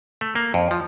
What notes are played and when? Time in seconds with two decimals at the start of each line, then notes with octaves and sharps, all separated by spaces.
0.21 A3
0.35 A#3
0.54 F2
0.71 F3